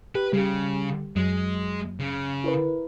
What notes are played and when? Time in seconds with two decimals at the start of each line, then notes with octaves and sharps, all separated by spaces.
0.15 G4 B4
0.33 C#3 G3 G4
1.16 F#2 F#3 G#3
2.00 C#3
2.44 E4 A#4 B4